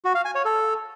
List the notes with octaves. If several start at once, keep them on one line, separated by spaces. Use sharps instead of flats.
F#4
F5
G#5
C#5
A4